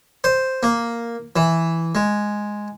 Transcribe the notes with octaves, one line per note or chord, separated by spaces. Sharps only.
C5
A#3
E3
G#3